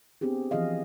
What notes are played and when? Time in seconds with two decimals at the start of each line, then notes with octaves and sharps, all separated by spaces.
0.21 B3 C4 D4 G4 G#4
0.51 E3 F3 C4 G#4 D#5 F5